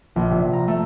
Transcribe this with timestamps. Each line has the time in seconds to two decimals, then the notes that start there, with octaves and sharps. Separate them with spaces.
0.16 A#1
0.31 C3
0.53 A#5
0.68 A3